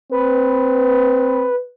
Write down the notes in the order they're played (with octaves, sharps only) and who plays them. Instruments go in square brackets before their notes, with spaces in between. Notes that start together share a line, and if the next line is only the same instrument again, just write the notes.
[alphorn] C4 [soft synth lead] B4